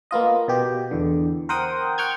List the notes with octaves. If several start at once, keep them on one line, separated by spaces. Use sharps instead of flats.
A#3 B3 F4 D#5
B2 G4
E2 D3
A#4 C5 F#5 G5 D#6
F#5 G5 C#6 F6 G6 G#6